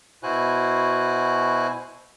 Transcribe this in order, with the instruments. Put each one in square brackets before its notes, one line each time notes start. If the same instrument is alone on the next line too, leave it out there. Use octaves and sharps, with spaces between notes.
[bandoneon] B2 E4 F#4 C5 G#5 F#6